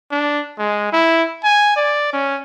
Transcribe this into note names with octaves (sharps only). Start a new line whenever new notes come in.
D4
G#3
E4
G#5
D5
C#4